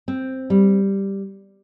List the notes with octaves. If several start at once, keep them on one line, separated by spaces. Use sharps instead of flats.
C4
G3